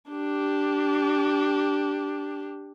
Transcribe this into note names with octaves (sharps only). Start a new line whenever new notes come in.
D4 G4